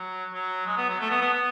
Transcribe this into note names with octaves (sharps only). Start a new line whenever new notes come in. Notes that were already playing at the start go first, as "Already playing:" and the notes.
Already playing: F#3
F#3
G#3
B3
F#3
A3
B3
B3
B3